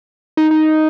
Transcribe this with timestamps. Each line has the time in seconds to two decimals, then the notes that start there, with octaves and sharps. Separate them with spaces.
0.37 D#4
0.51 D#4